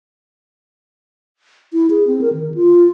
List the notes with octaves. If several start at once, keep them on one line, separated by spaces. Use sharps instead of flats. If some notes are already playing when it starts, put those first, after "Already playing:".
E4
G#4
C4
A#4
D#3
F4